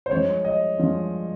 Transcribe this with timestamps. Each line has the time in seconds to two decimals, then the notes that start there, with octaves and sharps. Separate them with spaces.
0.06 C5
0.11 G2 F3 G#3 C#5
0.45 D#5
0.78 G2 F3 G#3